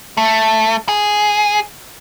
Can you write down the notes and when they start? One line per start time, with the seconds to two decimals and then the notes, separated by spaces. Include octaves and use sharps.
0.17 A3
0.89 G#4